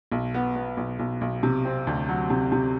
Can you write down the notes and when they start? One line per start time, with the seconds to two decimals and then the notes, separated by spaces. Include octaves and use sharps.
0.12 B1
0.34 B3
0.56 B3
0.77 B1
0.99 B1
1.21 B1
1.43 C3
1.65 C4
1.87 D2
2.09 F#3
2.30 C3
2.52 C3